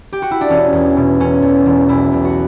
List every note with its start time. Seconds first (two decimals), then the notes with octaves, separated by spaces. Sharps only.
0.13 G4
0.22 F#4
0.31 E4
0.41 D4
0.50 E1 C#4
0.73 E2
0.96 B2
1.20 E1 C#4
1.42 E2
1.66 E1
1.89 B1 E4
2.12 B1
2.25 F#4